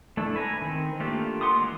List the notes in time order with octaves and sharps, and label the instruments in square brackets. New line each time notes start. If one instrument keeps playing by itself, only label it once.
[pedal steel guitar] A3 D4 E4
B4 G#5 A#5
D#3 C4
A3 A#3 D4 F4 G4
F#5 C6 D6 D#6
E3 G#3